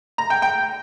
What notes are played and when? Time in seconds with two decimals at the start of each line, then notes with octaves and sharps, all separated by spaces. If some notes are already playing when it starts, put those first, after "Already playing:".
0.18 A#5
0.30 G5
0.42 G5